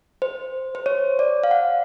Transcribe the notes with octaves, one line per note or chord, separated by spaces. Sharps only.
C5
C5
C#5
D5
F5
F#5